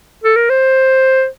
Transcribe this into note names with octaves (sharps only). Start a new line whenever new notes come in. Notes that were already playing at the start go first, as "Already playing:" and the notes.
A4
A#4
C5